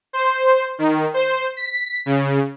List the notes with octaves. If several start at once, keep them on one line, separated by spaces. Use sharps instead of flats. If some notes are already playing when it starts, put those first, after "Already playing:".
C5
D#3
C5
B6
C#3